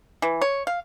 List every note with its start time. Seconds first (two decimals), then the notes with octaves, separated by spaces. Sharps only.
0.22 E3
0.42 C#5
0.67 F5